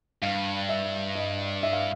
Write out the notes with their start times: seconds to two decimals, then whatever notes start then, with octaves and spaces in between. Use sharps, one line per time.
0.22 G2 F5
0.69 E5
1.15 D#5
1.63 E5
1.73 F5